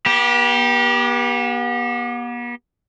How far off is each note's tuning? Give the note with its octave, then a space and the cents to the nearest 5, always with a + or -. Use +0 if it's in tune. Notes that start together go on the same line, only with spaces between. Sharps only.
B3 -40 G4 +0